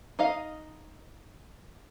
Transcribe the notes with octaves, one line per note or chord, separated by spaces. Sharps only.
D#4 D#5 F5